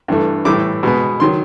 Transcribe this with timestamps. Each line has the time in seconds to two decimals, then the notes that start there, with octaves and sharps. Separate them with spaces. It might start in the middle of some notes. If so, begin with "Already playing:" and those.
0.08 G2 E3 A3
0.45 A2 E3 G3 D6
0.83 B2 G#3 B3
1.20 D#3 F#3 C6